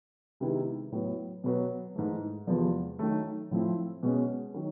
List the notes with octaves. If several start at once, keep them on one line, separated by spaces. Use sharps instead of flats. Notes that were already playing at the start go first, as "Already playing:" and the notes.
C3 D#3 G#3 B3 E4
A2 F#3 B3
B2 F#3 B3
G#2 E3 A3
E2 C3 F3 G#3 B3
D#3 F#3 A3
A2 F3 A3 C4 E4
B2 G#3 C#4
D#3 F#3